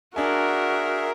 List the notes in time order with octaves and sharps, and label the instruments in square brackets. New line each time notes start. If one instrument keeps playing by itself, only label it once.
[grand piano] D4 G#5 [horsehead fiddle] F#4 [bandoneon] G#4 E5 [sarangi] A#4